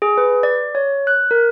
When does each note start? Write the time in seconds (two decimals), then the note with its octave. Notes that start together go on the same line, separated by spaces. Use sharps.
0.02 G#4
0.18 B4
0.43 D5
0.75 C#5
1.07 F#6
1.31 A#4